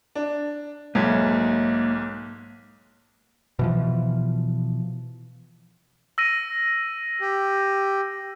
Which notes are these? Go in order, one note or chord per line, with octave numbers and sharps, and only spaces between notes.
D4
B1 G#2 A#3 C#5 E5
B2 E3 F3
E6 A#6 D#7
G4